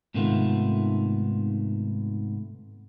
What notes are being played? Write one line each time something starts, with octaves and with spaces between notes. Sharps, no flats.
G#2 C3 D#3 A3 B3 F4